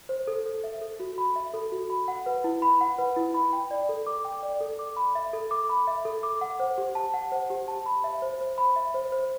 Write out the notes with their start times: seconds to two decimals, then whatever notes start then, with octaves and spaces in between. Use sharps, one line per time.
0.09 C5
0.28 A4
0.46 A4
0.64 E5
0.82 A4
1.00 F#4
1.18 B5
1.36 E5
1.54 A4
1.72 F#4
1.90 B5
2.08 F#5
2.26 B4
2.44 E4
2.62 B5
2.81 F#5
2.98 B4
3.16 E4
3.34 B5
3.53 G5
3.71 D5
3.89 A4
4.07 D6
4.25 G5
4.43 D5
4.61 A4
4.79 D6
4.96 B5
5.15 E5
5.33 A4
5.51 D6
5.69 B5
5.87 E5
6.05 A4
6.23 D6
6.41 F#5
6.60 C5
6.78 G4
6.95 A5
7.14 F#5
7.32 C5
7.50 G4
7.68 A5
7.86 B5
8.04 E5
8.22 C5
8.41 C5
8.58 B5
8.76 E5
8.94 C5
9.12 C5